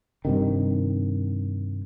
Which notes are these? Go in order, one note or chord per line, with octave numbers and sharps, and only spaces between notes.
G2 C3 D#3